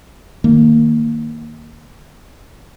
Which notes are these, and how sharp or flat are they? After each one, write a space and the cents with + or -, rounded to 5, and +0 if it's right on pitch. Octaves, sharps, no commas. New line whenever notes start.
D#3 +0 A#3 -10